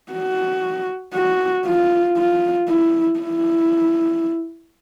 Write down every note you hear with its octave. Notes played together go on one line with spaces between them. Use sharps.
F#4
F#4
F4
F4
E4
E4